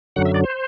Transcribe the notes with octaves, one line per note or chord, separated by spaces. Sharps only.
F#2 D3 F#3 F#5
E5
D5
C5